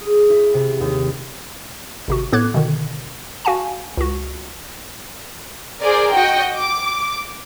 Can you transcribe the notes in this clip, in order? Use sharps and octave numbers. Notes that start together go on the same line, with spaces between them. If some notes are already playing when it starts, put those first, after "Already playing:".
G#4
E4
C3
D#2
G#1 C3 F#4
A2 B3 A4 D6 F#6 G#6
B2 D3 D#3
F#4 F5 G#5 A5
C#2 F#4
G#4 A#4 C5 D5
F#4 D#5 G5
D6